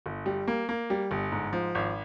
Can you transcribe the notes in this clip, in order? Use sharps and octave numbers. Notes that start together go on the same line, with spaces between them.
G1
G3
A#3
A#3
G3
G1
G#2
F3
G#1